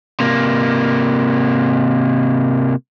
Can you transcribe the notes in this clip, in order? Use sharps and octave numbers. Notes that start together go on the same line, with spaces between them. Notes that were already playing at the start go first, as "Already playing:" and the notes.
C3 A#3